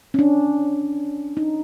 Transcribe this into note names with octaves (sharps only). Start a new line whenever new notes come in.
C#4
D4
D#4